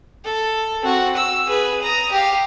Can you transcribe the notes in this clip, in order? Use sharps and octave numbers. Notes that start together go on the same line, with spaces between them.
A4
C4 F#4
E6
G#4 B4
A#5 D#6
G4 F5